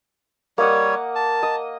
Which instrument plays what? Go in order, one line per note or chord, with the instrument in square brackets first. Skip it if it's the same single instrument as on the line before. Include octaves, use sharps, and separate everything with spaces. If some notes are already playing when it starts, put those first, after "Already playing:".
[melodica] G3 C#5 [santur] A#3 D#5 F#5
[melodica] A5
[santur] D#5